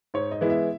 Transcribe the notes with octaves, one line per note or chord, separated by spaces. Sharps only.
G#2 C#5
D#5
E3 G#3 B3 E4
E5